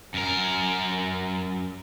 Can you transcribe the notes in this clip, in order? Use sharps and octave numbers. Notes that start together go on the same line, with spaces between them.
F#2 A#4